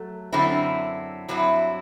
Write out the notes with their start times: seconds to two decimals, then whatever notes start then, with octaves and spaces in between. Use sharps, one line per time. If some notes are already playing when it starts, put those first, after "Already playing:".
Already playing: F#3 A3
0.33 F#2 D3 F#3 C4 E4
1.28 G2 F#3 C4 E4